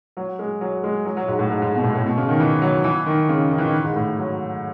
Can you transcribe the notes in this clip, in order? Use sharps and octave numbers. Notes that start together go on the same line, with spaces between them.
F#3
G#3
F#3
G#3
F#3
F#3
G#2
A2
G#2
G#2
B2
A2
A2
B2
C#3
D#3
E3
F#3
E3
D#3
C#3
D#3
E3
D#3
G#2
A2
F#3